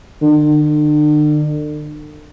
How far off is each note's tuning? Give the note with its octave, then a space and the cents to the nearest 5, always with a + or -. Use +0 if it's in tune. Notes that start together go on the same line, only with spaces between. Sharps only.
D3 +40